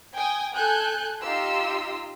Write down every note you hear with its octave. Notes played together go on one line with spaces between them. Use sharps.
G5 G#5 D#6
A4 G#5 F#6 G6
D#4 F4 G4 C6 E6